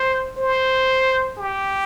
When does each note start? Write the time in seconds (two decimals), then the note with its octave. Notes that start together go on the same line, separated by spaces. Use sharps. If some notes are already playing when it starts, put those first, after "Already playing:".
Already playing: C5
0.38 C5
1.38 G4